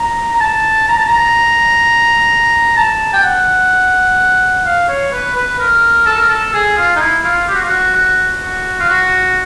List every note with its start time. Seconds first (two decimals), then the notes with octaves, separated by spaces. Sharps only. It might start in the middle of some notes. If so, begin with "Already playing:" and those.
Already playing: A#5
0.33 A#5
0.40 A5
0.88 A#5
0.98 A5
1.08 A#5
2.77 A5
3.14 G5
3.23 F#5
4.65 F5
4.88 C#5
5.12 B4
5.36 B4
5.59 A#4
6.06 A4
6.17 A#4
6.28 A4
6.54 G#4
6.77 F4
6.96 D#4
7.00 E4
7.24 F4
7.48 G4
7.55 F#4
7.63 F4
7.69 F#4
7.95 F#4
8.41 F#4
8.80 F4
8.89 F#4